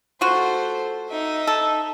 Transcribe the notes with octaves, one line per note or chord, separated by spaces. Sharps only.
A3 F4 F#4 C5
D#4 E5
A4